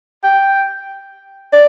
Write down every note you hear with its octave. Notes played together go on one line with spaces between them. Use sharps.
G5
D5